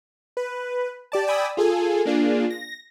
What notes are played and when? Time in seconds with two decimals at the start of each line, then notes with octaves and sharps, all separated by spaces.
0.37 B4
1.12 G4 D5 A5
1.27 D5 G5 G#5 B5 D#6 E6
1.57 F4 G#4 A4 G#5
2.05 A#3 D4 F4 G#4
2.50 A#6